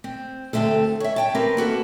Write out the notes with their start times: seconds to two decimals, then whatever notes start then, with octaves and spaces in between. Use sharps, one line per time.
0.04 C4
0.53 D2 C3 A3 C4 A4
1.00 C#5 E5
1.16 C#5 G5 A5
1.35 C4 G4 A#4 B4
1.57 A#3 F#4 A4 B4